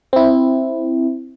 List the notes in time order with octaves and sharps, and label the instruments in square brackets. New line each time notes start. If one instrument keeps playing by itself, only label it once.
[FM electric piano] C4 E4